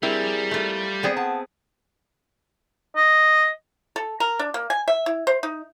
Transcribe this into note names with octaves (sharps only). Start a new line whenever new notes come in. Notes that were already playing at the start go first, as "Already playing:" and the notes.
G3 C4 E4 G#4 A#4
A3 F4
B3 C4 G#4 D5
F#5 A5
D#5
A4
A#4
D4
A#3
G#5
E5
E4
C5
D#4